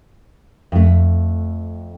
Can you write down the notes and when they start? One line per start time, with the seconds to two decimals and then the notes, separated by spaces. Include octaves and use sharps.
0.72 F2 A3